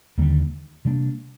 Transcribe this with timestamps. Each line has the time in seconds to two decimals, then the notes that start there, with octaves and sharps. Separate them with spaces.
0.18 D#2 D3 G3 A#3
0.85 C3 G3 A#3 D4